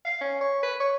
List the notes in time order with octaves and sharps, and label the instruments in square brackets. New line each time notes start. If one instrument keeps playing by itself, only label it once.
[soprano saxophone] F5
C#4
C#5
B4
C#5